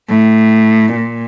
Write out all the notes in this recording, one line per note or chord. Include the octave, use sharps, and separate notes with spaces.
A2
A#2